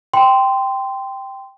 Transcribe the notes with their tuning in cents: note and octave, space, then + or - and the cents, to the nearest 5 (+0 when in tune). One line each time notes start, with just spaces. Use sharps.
G5 +0 C6 -15